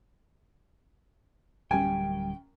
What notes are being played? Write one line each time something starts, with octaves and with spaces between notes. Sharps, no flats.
D1 F#2 G3 G5 G#5